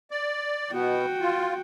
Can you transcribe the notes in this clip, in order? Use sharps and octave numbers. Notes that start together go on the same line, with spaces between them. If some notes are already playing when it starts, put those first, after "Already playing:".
D5
B2 B3 F#4 G5
F4